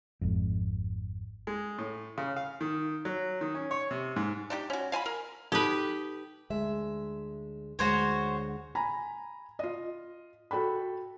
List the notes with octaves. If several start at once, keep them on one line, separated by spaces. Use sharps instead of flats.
G#1 F2
G#3
A2
C#3
F5
D#3
F#3
D#3
C#4
C#5
C3
G#2
D4 D#4 G4
C#4 F#4
F5 G#5 A5 B5
A#4
D#4 G4 A4 B4
D2 G#3 E5
D2 G#3 F#4 C5 C#5
G#5 A#5 B5
F4 D#5
F#4 A4 G5 B5